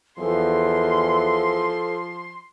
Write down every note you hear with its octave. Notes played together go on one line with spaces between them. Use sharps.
E2 F3 A4 C6